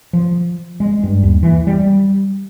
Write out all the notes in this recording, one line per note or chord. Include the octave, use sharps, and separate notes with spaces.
F3
G#3
G2
D#2
E3
G3